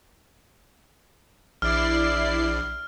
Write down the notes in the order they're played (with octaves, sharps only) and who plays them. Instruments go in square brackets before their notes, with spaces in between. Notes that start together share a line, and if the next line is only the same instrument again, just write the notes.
[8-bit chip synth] A#1 [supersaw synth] E4 D5 C7 [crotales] F6